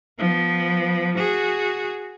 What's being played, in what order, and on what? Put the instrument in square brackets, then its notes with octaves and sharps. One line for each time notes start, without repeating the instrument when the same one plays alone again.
[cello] F3 B3
F#4 G#4